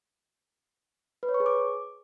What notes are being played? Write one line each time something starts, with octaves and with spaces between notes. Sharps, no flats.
B4
C#5
C#6
G#4
D6